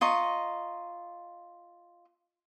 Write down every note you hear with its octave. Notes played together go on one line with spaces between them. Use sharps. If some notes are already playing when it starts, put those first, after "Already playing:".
F4 D#5 A#5 C#6